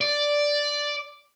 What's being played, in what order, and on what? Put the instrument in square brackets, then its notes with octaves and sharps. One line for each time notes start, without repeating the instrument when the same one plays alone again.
[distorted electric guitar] D5